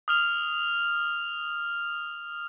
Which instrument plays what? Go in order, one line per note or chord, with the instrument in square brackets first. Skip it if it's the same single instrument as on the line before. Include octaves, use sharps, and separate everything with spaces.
[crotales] D#6 F6 F7